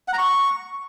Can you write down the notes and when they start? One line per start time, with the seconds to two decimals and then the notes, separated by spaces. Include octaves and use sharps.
0.08 F#5
0.13 A#5
0.18 C#6